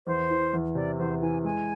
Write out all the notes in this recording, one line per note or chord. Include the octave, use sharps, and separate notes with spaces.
E2 C5
E3
E2
C3 D5
E2 C5
E3 G#5
G#3 G#5